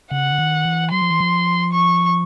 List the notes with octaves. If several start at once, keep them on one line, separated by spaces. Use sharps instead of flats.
C#3 F#5
D3
D#3
E3
F#3 C6
F3
E3
F3
C#6